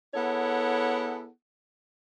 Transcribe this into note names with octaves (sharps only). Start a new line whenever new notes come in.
B3 E4 G#4 A4 C#5 F#5